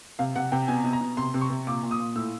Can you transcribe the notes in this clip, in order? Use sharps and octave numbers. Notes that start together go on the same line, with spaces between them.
C3 F5
C3 F#5
C3 G5
B2 G#5
B2
A#5
B2
C3 C6
C3
C#6
C3
A#2 D6
A#2
D#6
A#2
A2 E6